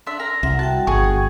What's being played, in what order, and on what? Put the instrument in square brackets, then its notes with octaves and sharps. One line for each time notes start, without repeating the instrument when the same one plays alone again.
[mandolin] D4 E5 [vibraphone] C6
[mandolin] A#4 A#5
[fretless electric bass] C2 [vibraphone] E5 F#5
[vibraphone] F#4 F#5 G5 [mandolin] A5
[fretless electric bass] G1 [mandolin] G#4 C#6